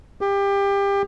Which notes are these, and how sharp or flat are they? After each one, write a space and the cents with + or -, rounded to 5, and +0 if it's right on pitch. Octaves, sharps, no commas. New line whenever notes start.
G4 +25